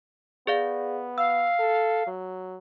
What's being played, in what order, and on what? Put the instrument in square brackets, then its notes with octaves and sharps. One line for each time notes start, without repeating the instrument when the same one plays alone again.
[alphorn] B3 [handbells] G#4 D5 F5
[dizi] F5 [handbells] E6
[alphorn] A4
F#3